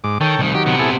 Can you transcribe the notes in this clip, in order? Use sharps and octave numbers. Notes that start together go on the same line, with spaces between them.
G#2 D6
D#3 A4 C#5 G5
C2 D#3
D#3 F#3 G4
C3 B3
E4 G#4 A4